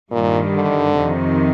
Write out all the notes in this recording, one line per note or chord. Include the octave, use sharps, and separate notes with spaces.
G2 A#2 D#3 G3
D3
F2 C3 D#3